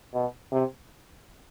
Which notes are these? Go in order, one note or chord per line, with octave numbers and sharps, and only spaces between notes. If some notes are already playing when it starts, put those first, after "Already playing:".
B2
C3